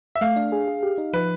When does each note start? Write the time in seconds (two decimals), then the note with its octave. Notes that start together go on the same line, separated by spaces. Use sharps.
0.15 E5
0.21 A3 F5
0.36 D4
0.52 G#4
0.68 G#4
0.83 G4
0.98 D#4
1.13 F3 B4